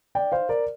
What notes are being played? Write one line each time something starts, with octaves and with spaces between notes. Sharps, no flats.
D5 G5
C5 F5
A#4 D5